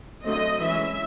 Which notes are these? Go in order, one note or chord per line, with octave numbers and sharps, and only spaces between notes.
D3 F#3 A3 C4 D#5
E3 G#3 C#4 E5